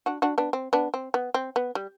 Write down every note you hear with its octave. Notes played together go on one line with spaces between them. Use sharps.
D4 F#4
D4 F#4
B3 D4
C4
B3 D4
C4
B3
C4
B3
G3